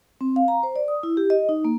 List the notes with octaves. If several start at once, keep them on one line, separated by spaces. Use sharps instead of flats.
C4
F5
A#5
C5
D5
D#6
E4
G4
D#5
D#4
A#3